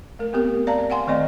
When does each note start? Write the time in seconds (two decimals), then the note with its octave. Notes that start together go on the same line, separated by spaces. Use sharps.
0.19 A3 A#4
0.33 B3 C4 G4 A#4
0.67 D5 F5 A5 A#5
0.90 F5 F#5 G#5 C6
1.07 D#3 A3 C4 D5 D#5